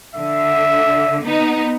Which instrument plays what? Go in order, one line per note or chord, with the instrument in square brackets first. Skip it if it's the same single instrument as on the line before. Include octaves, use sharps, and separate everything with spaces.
[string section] D3 [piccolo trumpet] E5
[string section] B3 D#4